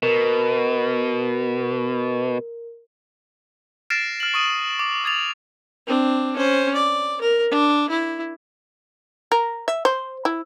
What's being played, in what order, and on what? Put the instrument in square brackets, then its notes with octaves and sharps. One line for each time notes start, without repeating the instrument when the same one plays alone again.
[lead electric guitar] B2 [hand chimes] A#4
[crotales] F6 A6 A#6 C7 D7 E7
F6 F#7
C#6 D#6 D#7
D6
D#6 G#6 A6 F7
[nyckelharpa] C4 D4
C#4 C5
D5
A#4
D4
E4
[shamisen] A#4
E5
C5
E4